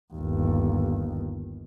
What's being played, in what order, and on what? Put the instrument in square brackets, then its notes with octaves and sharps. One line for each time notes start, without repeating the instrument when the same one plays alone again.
[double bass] G1 D#2